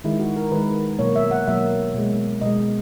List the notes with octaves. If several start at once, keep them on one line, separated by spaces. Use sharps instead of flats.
D#3 G#3 E4
F#4
A#4
D#3 G#3 B4
B2 F#3 A#3 C#5
E5
F#5
B2 F#3 A#3 E5
B2 G#3
B2 G#3 D#5